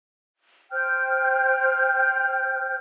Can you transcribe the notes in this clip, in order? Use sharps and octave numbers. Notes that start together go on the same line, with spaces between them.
C5 G5 F6 G6